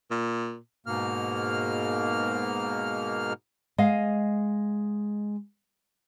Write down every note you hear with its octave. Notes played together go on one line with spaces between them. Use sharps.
A#2
G#2 B2 A#3 F6
G#3 D#5 F5